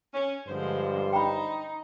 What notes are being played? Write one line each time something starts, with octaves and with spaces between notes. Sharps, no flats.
C#4
G2 D3 F3 G#3 C5
D#4 G5 A#5 B5